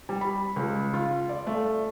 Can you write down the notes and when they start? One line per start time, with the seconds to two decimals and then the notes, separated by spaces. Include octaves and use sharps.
0.09 G3
0.21 B5
0.56 C#2
0.93 F4
1.29 D5
1.47 A3